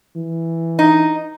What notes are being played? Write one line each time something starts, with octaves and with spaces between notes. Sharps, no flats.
E3
D#4